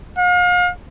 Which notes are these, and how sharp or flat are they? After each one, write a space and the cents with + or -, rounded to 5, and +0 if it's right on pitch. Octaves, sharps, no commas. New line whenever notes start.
F5 +40